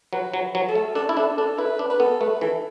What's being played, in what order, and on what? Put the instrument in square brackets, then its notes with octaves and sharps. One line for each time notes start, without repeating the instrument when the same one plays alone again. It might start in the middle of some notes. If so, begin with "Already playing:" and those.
[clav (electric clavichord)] F#3 [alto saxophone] B4
[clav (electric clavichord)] F#3
F#3
[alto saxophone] A4
[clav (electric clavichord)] A3
[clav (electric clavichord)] D4 [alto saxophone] A4
[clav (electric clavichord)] E4
[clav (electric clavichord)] D4 [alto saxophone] A4
[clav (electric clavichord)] D4 [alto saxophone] A4
[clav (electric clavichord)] E4 [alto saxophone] B4
[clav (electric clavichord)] D4
[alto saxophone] B4
[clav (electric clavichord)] B3 [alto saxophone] A4
[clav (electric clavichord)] A3 [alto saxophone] B4
[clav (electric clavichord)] E3 [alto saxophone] A4